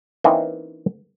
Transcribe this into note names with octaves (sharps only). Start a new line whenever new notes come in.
E3 A#3 C4 C#4 D#4